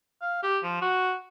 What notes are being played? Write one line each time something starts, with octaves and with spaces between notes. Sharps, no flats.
F5
G4
F3
F#4